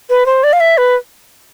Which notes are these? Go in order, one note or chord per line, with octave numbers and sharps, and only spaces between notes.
B4
C5
D5
F5
E5
B4